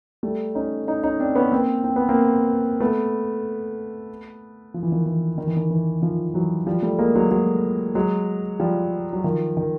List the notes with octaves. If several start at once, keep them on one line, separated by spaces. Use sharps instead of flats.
G3 A3
C#4 D#4
C#4 D#4
C#4 D#4
C4 D4
B3 C#4
A#3 C4
C4
B3
A#3 C4
A3 B3
F3
E3
D#3 F3
E3
D#3
E3
D#3
E3
D#3 F3
E3 F#3
F3 G3
G3 A3
G#3 A#3
F#3 G#3
F#3 G#3
F#3 G#3
F3 G3
F#3
D#3 F3
D#3